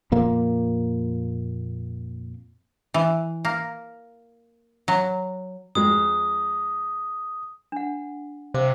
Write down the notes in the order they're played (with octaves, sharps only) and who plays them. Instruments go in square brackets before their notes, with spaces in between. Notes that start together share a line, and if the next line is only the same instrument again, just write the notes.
[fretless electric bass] F2 A#2 A#3
[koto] E3
A#3
F#3
[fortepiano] F2 G#3 [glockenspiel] D#6
[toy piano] D4 F#5
[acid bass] C3 [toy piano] C5 F5 D6